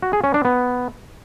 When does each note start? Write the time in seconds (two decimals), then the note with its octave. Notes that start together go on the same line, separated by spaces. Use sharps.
0.02 F#4
0.13 G#4
0.24 C#4
0.34 D4
0.45 B3